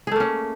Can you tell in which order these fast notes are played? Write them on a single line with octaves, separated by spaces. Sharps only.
G#4 A3 A#3 C#4